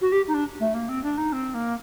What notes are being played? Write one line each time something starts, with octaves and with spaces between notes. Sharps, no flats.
F#4
G4
D#4
D4
A3
A#3
C4
D4
D#4
C4
A#3